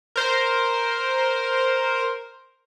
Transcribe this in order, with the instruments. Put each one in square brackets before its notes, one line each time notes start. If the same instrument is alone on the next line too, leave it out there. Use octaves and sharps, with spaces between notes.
[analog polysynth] A#4 C5